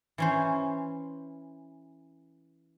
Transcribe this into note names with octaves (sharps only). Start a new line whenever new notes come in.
E3 C#4 C5